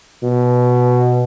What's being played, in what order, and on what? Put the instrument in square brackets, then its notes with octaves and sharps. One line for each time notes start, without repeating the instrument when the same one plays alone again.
[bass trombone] B2